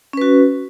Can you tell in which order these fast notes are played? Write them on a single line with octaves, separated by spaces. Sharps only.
C#4 B4 F#4